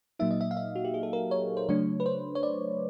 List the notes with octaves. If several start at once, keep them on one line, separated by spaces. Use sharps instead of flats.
A#2 F#3 A#3 D#4 E5
D#5
E5
F5
E5
F#4
G4
G#4
A4
A#4
C#5
C5
C#3 F#3 A3 D4 C#5
B4
C5
C#5
D5